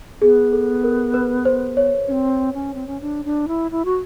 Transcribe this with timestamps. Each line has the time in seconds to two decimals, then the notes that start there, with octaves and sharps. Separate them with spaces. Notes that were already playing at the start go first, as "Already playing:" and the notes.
0.21 B3 G#4
0.53 A4
0.84 A#4
1.14 B4
1.45 C5
1.77 C#5
2.08 C#4
2.12 C4
2.54 C#4
2.74 C4
2.87 C#4
3.01 D4
3.25 D4
3.48 E4
3.71 E4
3.85 F#4